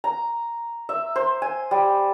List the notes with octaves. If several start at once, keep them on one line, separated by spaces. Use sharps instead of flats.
A#5
E5
C5
G#5
G3